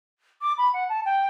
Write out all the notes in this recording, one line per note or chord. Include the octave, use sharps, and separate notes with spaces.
D6
B5
F#5
A5
G5